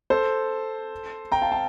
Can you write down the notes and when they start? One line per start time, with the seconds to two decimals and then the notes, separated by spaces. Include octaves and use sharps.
0.10 A4 C5
1.32 G5 A#5
1.42 F5 A5
1.52 F5 A5